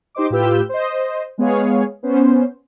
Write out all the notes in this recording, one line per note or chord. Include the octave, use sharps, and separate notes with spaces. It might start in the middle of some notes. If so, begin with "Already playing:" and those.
D#4 G4 C5 D#5 D6
A2 F4 G4 B4 E6 G6
C5 D#5
G#3 B3 G#4 C#5 F5
B3 C#4 C5